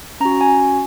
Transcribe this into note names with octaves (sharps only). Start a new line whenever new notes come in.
C#4 F#4 A#5
G#5